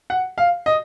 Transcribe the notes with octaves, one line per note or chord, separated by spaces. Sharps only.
F#5
F5
D#5